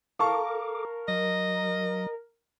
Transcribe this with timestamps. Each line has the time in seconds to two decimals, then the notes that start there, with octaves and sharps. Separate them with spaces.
0.19 A4 A#4 F5 A5 C#6 D6
1.08 F#3 D#5